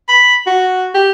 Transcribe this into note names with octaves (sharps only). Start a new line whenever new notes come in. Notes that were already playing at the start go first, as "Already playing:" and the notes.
B5
F#4
G4